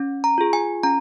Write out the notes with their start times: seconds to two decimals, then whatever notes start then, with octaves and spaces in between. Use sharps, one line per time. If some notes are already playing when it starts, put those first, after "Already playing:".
Already playing: C#4
0.24 A#5
0.38 F4 G#4
0.53 G#5
0.83 C#4 A#5